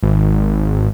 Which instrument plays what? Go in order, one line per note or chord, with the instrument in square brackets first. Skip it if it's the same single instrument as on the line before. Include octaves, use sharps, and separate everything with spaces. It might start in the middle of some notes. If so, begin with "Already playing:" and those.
[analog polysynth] G#1